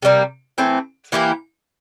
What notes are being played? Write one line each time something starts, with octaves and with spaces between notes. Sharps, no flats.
C3 G3 A#3
E3 A3 C4
E3 A#3 E4 G4